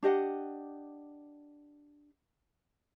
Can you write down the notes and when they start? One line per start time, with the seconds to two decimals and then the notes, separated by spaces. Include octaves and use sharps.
0.03 D4 G4 D#5 F#5